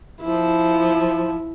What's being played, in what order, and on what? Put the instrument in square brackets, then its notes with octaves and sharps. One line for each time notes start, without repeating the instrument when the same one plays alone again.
[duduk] F3 [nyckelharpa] E4